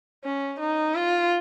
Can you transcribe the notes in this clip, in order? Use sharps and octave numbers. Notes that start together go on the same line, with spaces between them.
C#4
D#4
F4